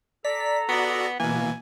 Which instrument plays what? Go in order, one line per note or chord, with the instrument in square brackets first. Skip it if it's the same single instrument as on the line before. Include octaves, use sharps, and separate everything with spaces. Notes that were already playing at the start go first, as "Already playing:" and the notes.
[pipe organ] A4 A#5 [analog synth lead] D5 [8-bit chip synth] B6
[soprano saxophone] B3 [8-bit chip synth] F#4 D5 [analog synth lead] D#6
[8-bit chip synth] B2 E3 [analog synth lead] A#3 [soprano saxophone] G#5